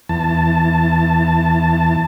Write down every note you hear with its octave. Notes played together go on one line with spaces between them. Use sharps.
E2 A5